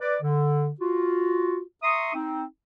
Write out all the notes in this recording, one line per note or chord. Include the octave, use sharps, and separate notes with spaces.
B4 D5
D3
F4 F#4
E5 A#5 C6 C#6 D#6
C4 D#4